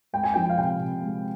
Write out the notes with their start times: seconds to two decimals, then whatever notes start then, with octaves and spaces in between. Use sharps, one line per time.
0.13 G#3 G5
0.24 G#5
0.34 F3 G5
0.50 F5
0.58 C3 G5
0.80 C3
1.02 G#3